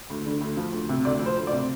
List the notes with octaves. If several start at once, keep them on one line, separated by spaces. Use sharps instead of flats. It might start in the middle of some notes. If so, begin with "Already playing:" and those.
D2
D3
D2
F3
D2
C3
D2 D5
F3 C5
D2
D5
C3